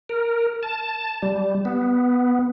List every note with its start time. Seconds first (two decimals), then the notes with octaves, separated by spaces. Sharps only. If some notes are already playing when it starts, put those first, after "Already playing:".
0.09 A#4
0.63 A5
1.22 G3
1.65 B3